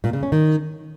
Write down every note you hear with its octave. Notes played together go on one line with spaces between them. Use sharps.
A#2
C#3
C#4
D#3